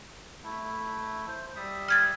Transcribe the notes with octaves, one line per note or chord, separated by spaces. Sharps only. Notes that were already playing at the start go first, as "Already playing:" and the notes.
A3 E4
C5
G3 E5 D#6
F6 G#6 A6